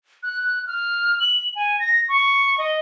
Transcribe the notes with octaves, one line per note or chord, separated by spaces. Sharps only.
F#6
F6
F#7
G#5
A#6
C#6
D#5